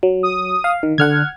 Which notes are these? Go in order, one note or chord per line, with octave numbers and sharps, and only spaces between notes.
F#3
D#6
F5
D#3
D3 F#5 F6 G#6